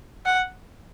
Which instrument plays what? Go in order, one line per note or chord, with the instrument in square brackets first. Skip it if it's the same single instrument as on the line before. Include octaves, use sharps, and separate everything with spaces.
[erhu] F#5